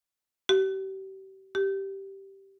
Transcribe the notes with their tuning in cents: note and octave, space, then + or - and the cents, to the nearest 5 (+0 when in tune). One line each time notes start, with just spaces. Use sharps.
G4 -35
G4 -10